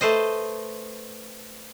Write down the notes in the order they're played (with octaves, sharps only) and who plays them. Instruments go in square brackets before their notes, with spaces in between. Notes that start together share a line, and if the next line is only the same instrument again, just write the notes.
[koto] A3 B4 C5 D#5